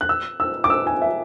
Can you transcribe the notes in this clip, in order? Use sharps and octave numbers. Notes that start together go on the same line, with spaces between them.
F#6
E6
E6
D6
E6
G#5
E5